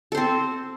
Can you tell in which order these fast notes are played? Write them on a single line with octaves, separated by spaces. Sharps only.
A4 C5 C4